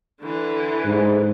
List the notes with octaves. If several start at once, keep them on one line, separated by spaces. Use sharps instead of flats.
D3 E3
G#2